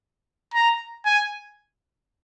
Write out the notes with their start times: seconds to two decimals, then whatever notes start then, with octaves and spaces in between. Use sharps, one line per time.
0.54 A#5
1.05 G#5